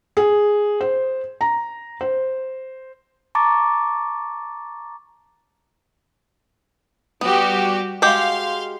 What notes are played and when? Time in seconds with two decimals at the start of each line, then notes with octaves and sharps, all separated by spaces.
0.17 G#4
0.81 C5
1.41 A#5
2.01 C5
3.35 A5 A#5 C#6 D6 A6
7.21 G3 B3 F#4 G4
8.02 G#3 F#4 G4 F5 C6